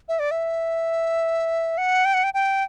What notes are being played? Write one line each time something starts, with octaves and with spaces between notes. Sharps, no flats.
E5
D5
E5
F#5
G5
F#5
G5
G5